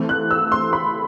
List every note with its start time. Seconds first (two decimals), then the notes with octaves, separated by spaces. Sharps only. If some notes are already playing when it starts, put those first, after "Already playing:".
Already playing: E3 A3 C4
0.09 F#6
0.31 E6
0.52 C6
0.73 B5